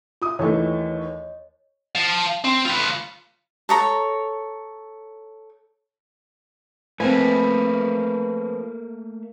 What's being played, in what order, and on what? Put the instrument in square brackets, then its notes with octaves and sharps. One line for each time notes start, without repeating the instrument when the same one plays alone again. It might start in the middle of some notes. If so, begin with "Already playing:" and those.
[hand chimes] F4 E5 [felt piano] D6 D#6
[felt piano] D#2 E3 A3 [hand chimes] C#5 D#5
[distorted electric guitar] F5 A5
C4
F4 B4
[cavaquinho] A4 C#5 A#5
[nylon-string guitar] F3 C4 [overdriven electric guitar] A3 A#3 [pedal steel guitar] B4 G#5